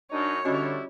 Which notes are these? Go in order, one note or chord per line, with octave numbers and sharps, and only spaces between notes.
F#2 D4 D#4 C#5
D3 G3 C#4 D4 E4 F#4 D#5